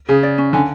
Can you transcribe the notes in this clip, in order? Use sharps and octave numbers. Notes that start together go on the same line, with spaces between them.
C#3 G#4
D5
C#4
D3 G#5